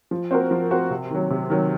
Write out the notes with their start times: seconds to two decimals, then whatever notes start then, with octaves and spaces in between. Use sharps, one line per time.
0.11 F3
0.31 C4 F#4 A#4
0.51 F3
0.71 C4 F#4 A#4
0.90 C3
1.11 D#3 F#3
1.30 C3
1.50 D#3 F#3